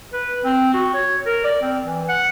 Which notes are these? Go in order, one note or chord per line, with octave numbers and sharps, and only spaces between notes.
B4
C4
F#4
C#5
A#4
D5
C4
E3
F#5